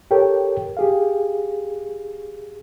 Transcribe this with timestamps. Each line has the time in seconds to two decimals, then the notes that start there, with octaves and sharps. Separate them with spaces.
0.11 G4 A4 A#4 C#5 G5
0.77 G4 G#4 F5